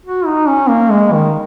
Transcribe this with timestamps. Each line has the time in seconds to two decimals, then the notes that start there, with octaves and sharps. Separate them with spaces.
0.05 F#4
0.26 D#4
0.47 C#4
0.69 A#3
0.90 G#3
1.13 D#3